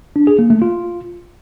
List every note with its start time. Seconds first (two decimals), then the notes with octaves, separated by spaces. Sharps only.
0.16 D4
0.27 G#4
0.39 A#3
0.50 A3
0.62 F4